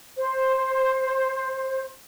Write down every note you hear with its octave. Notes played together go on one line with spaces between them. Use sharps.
C5